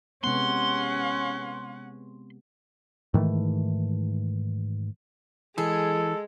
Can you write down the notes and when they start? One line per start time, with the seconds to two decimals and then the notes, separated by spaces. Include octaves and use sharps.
0.24 C3 G#3 B3 C#4 F#5 C6
3.14 G#2 D#3 E3 A3
5.58 E3 G#3 G#4 A4